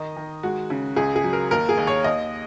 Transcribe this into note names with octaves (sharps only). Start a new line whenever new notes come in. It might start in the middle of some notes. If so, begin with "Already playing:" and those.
Already playing: D#3 D#5
D#3
G#3 F#4
C#3
C#2 G#4
G#4
F#3
A#4
D#2 A#4
G#4
D#2
C#5
D#2 D#5